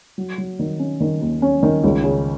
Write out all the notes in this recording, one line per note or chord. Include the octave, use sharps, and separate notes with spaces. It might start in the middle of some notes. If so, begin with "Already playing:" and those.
F#3
F#3
D#3
C#4
D#3
D#2
C#4
D#3
C#2
C#3